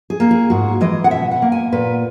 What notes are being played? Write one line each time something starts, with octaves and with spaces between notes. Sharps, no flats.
G#4
A#3
G#4
G#2 F#4
E3 G#3 D#5
F#5
B2 E5
F#5
A#3
G#5
A#2 B4